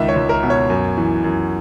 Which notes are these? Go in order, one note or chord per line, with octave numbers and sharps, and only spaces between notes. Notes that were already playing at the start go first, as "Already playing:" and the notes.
Already playing: C#2 D#3 E5
C#5
C#2
A#4
B2
C#5
F#2
E3
F#2